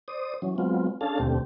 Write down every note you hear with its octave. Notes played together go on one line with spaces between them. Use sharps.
C5 D5 D#6
E3 F#3 C#4
F#3 G#3 B3 C4 F4
C#4 D4 G#4 A4 F5 A5
D#2 B2 D3 A3 C4 G4